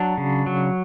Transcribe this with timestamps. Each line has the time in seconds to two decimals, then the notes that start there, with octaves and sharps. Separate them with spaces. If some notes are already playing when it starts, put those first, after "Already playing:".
Already playing: F#3 D4
0.18 C#3
0.46 F#3